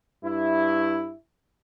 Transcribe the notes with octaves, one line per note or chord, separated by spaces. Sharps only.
G2 E4